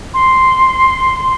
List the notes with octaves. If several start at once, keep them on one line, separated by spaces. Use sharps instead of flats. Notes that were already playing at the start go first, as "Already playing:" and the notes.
C6